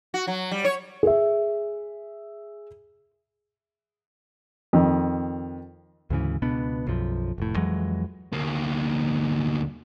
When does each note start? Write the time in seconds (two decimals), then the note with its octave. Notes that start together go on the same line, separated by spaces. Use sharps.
0.14 F#4
0.27 F#3
0.51 G3
0.64 C#5
1.03 G#4 E5
4.73 F2 D#3
6.10 D2 G#2 C#3 E3
6.42 C#2 B2 B3 D4
6.87 B1 F#2 F3
7.38 F1 A2
7.56 F2 E3 F#3 G#3
8.33 D2 A#3